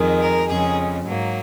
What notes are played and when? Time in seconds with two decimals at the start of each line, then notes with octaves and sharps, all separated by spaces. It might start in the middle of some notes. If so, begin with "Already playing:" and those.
Already playing: F2 D#3 G#3
0.21 A#4
0.49 F2 C#3 G#3 G#4
1.05 G#2 F#3 A#3